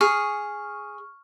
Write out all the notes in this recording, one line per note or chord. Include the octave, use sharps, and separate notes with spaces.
G#4 C#6 F6